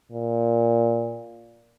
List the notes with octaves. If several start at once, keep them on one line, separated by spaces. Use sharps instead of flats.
A#2